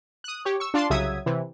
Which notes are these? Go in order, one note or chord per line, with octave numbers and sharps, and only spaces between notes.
D#6 F#6
G4 C#5
C#6 E6
D4 F4 D5 A5 C6
C2 C#3 F#3 E5 D#6 G#6
C3 E3